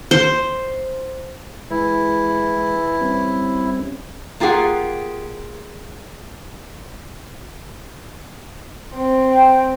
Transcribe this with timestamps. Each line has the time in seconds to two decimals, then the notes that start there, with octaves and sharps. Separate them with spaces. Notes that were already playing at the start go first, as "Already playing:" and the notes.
0.11 C5
1.71 E3 G#3 E4
3.01 G3 C4 C#4
4.40 A#3 F4 G4 G#4 F#5
8.94 C4
9.30 G5